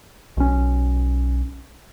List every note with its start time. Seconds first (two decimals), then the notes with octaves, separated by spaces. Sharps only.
0.37 B1 C#4